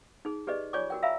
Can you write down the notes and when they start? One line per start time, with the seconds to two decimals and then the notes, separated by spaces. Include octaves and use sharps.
0.25 D#4 G#4
0.47 G4 G#4 B4 D5 D#5
0.73 F4 C#5 D5 G#5 C#6 D6
0.90 F#4 A#4 G5
1.03 E5 F5 G#5 A#5 B5 E6